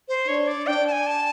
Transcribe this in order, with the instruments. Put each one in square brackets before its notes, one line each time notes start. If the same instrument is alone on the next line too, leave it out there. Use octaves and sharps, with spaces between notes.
[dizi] C5
[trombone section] D4 [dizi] C#5
[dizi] D5
[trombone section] D4 [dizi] G5
[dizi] A5
G#5
A5